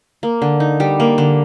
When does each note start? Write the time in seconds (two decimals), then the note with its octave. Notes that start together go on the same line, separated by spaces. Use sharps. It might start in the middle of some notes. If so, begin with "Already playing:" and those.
0.23 A#3
0.42 D3
0.60 D#4
0.80 G3
1.00 A#3
1.18 D3